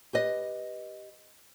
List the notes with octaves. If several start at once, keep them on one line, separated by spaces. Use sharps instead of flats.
G4 B4 D#5